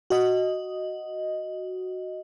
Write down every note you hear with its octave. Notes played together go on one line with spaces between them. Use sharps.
F#4 D#5